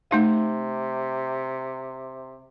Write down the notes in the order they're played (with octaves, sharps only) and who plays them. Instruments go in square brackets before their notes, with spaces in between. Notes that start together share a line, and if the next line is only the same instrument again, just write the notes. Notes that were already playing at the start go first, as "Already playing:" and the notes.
[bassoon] C3 [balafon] A3 D#4 F5